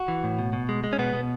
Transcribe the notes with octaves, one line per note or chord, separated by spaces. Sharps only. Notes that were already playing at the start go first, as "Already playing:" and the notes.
Already playing: F#4
E3
A2
B2
B2
G#3
G#3
C#4
B2 B3
B2